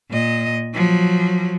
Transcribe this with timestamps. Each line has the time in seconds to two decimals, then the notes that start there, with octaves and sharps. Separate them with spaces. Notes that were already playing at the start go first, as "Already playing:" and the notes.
0.10 A#2 D#5
0.74 F3 F#3